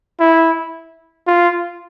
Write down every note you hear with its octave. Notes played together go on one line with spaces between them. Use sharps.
E4
F4